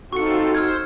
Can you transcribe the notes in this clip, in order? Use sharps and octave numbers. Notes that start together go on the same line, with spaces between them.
C4 D#4 F4 F#4 A4 C#6 C#7
C5 E6 F6 G#6